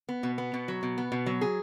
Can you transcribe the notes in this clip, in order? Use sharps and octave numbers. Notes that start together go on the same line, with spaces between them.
B3
B2
B3
B2
F#3
B2
B3
B2
F#3
G#4